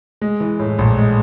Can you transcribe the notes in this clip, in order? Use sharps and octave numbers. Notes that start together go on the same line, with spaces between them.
G#3
E3
A2
A#1
G#3